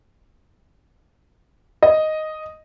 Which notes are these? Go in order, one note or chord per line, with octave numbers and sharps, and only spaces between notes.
D#5